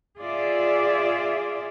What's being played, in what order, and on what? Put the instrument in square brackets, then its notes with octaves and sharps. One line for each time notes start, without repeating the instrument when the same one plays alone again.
[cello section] F4 G#4 D5 E5